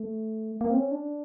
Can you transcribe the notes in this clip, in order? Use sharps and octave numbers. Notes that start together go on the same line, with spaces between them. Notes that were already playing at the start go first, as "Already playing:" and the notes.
Already playing: A3
A#3
C4
C#4
D4